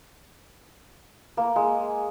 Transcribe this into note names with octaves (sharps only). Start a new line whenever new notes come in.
A#3
G#3